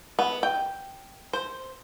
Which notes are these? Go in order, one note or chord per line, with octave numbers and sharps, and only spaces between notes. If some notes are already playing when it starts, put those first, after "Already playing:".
B3
G5
C5